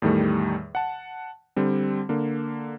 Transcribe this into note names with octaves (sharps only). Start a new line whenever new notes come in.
E2 A2 D#3 G3 A3
F#5 A5
D3 G3 C4
D3 A#3